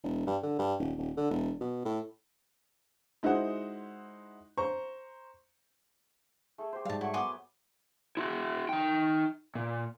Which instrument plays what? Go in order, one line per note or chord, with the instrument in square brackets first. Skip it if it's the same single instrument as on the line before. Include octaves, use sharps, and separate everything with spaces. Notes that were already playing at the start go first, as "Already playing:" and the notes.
[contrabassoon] E1
G2
D3
G2
D#1
D#1
D3
E1
B2
A2
[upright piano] G#3 D#4 E4 F#4 C5 F#5
C5 A#5 C#6
[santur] A3 G#4 A4
G4 C5
[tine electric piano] G#2 G3 [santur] G#4 [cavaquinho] F5 A5
[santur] F#3 A3 C#6 [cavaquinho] E4
[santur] B3 B4 [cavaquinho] G#5 C6 D6
[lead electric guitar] E4 F#4
D#4 G5
A#2